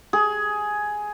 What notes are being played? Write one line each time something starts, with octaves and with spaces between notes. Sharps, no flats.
G#4